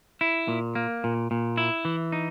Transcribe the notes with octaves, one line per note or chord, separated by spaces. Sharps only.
E4
A#2
A#3
A#2
A#2
E4
E3
D#4